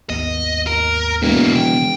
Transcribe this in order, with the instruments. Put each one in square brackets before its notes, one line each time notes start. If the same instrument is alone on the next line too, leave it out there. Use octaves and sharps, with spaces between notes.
[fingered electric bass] G#1 D#2 B3 [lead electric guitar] D#5
[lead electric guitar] A#4
[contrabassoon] E1 [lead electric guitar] G#2 A#3
[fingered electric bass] C#3 E3 F3 [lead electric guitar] G5